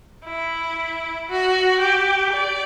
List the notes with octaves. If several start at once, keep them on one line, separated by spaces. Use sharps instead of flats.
E4
F#4
G4
D5